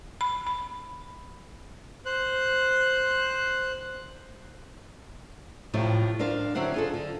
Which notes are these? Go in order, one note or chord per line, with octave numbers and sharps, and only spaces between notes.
B5
B5
C5 F#6
A2 C3 F3 F#3 C4 E4
D4 A#4 C5 F5
D3 F#3 C4 E4 C5 F#5
F4 G#4 A4
D3